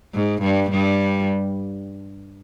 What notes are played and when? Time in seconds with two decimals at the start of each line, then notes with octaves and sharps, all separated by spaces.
0.14 G#2
0.43 G2 G3
0.71 G2 G3